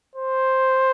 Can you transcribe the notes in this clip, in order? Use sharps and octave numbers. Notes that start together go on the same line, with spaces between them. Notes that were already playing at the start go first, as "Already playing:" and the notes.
C5